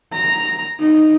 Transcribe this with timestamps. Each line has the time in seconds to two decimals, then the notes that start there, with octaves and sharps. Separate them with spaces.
0.13 A#5
0.80 D#4